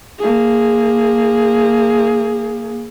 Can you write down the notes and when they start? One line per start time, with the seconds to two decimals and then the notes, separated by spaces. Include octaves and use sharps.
0.19 A#3 G#4